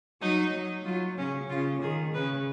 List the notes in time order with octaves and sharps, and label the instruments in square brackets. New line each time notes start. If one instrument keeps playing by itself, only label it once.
[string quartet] F#3 [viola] D#4
[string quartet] F#3
[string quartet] F#3 [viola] F4
[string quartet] C#3 [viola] C#4
[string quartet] C#3 [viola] F4
[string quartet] D#3 [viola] G#4
[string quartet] C#3 [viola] B4